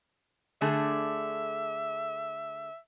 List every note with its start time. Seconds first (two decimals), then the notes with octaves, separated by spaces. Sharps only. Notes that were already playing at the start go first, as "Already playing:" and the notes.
0.61 D3 A3 G#4 E5